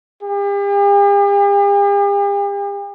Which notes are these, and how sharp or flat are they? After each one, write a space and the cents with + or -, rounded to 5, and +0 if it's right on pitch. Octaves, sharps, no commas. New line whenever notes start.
G4 +45